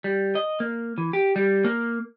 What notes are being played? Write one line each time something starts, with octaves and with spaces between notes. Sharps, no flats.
G3
D#5
A#3
E3
G4
G3
A#3